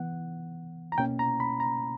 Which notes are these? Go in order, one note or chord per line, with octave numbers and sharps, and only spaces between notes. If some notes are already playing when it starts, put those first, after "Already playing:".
Already playing: E3 B3 F#5
A#5
B2 A#3 C#4 G5
A#5
B5
A#5